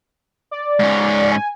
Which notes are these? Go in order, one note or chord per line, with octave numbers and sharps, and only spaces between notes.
D5
G#2 C#4
G#5